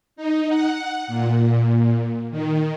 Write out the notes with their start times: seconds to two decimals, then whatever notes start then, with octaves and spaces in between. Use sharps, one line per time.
0.16 D#4
0.49 F#5
1.08 A#2
2.31 D#3